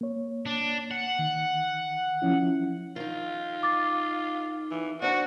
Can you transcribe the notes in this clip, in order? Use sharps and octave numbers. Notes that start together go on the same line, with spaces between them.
A#3 C#5
D4
F#5
D#3
F3 C#4 E4
D#3 D#4 F4
D6 A6
E3
C4 D4 F#4 D5